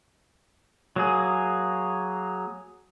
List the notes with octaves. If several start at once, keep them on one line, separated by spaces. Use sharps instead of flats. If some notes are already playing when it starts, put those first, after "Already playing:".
F#3 A#3 G#4